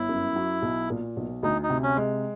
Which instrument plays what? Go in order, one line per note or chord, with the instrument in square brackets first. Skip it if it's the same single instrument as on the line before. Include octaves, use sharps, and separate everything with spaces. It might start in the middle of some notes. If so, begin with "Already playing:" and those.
Already playing: [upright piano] G1 [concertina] E4
[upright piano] F#2
F#3
B1
A#2
B1
[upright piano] D2 [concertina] D#4
[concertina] D#4
[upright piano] C3
[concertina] C#4
[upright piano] G#3